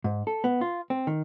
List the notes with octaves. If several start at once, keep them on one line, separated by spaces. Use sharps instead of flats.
G#2
A4
B3
F4
C4
D#3